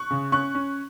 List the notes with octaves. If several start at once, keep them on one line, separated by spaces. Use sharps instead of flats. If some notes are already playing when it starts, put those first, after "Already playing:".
Already playing: C#6 F#6
C#3
C#4 C#6 F#6
C#4